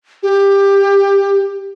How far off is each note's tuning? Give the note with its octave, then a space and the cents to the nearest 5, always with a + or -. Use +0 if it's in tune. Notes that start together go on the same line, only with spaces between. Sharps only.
G4 +15